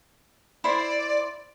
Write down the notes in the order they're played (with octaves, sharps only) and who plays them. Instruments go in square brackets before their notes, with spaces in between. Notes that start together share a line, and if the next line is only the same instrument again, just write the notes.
[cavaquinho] E4 C5 C6 [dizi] D5